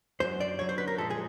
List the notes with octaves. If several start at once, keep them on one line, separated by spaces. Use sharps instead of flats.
F#2 D3 F#3 C5
D5
F#2 D3 F#3 C#5
C5
B4
A#4
A#2 F3 G#3 A4
G#4